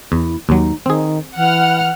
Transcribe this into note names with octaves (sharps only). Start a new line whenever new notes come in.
E2 E4
D#2 F#3 D#4
D#3 C4 G#4
E3 F#5 F6